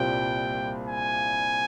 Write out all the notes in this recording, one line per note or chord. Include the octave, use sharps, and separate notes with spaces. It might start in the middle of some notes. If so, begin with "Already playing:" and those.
Already playing: C2 A#2 G3 C4 F4 G5
G#5